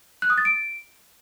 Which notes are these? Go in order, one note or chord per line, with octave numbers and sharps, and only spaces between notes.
F#6
D#6
A6
D7